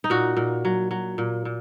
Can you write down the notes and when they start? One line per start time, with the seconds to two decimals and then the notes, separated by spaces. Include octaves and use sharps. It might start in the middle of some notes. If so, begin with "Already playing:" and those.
0.04 D#4
0.10 A#2 F#4
0.37 A#2
0.65 F#3
0.91 F#3
1.18 A#2
1.45 A#2